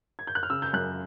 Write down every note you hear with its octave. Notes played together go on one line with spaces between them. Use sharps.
G#6
G6
F#6
F6
C#3 E6
G6
F#2 F#6